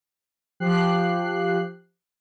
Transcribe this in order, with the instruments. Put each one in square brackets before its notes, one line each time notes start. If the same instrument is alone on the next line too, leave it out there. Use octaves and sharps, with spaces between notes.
[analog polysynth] F3 G4 F#6 C7